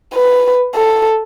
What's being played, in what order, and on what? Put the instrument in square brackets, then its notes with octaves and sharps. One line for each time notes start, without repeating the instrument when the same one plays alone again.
[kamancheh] B4
A4